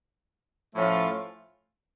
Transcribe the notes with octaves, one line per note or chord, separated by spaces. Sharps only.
A2 F3 A3 C#4 F4